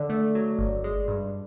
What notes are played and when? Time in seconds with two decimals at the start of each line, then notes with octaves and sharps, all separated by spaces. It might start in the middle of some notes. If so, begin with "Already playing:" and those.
Already playing: D3 D5
0.09 A3
0.35 F#3
0.59 G1
0.84 G#3
1.08 G2